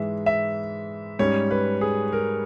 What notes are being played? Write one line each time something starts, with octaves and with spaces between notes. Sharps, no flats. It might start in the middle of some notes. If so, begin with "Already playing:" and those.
Already playing: G#2 E3 G#3 E5
E5
G#2 G3 C#4 C#5
B4
G#4
A#4